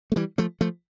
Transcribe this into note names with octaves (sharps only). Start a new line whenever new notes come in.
A3
E3 G3
F3 A3
F3 A3